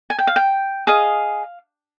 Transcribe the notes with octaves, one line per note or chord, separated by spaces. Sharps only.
G#5
G5
F5
G5
G#4 D#5 F5